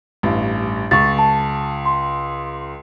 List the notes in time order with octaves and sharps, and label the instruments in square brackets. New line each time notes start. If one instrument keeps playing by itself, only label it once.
[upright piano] A1 G2
[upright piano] C#2 [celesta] C#6 A6
[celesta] A5
C6